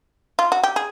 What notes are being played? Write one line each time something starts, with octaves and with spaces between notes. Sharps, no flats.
F4
F#4
G4
G#4